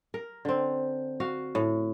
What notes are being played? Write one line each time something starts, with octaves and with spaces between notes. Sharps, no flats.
A#4
D3 C4
F#4 F5
A2